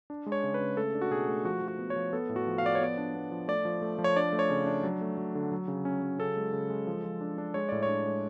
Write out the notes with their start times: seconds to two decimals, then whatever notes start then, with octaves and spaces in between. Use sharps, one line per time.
0.10 D4
0.26 G#3
0.32 C#5
0.43 C#3
0.54 B4
0.61 C#3
0.77 A3 A4
0.95 D4
1.01 F#4
1.10 B2 G#4
1.28 A3
1.45 F3 F#4
1.62 F3
1.68 F#4
1.79 B3
1.90 C#5
1.96 F3
2.13 B3 A4
2.29 A2
2.36 F#4
2.47 F3
2.58 F5
2.63 F3 D5
2.75 C#5
2.81 B3 D5
2.98 D4
3.15 B3
3.31 F3
3.48 A3 D5
3.65 F3
3.82 A3
3.98 F3
4.04 C#5
4.16 D4 D5
4.33 A3
4.39 C#5
4.50 C#3
4.66 D4
4.83 F#3
5.01 A3
5.18 F#3
5.35 D3
5.52 F#3
5.68 C#3
5.85 C#4
6.02 F#3
6.19 C#3 A4
6.37 G#3
6.53 C#3
6.70 G#3
6.87 F3
7.05 F3
7.21 D4
7.38 D4
7.54 G#3 C#5
7.69 A2 D5
7.83 C#5
7.88 D4
8.06 G#3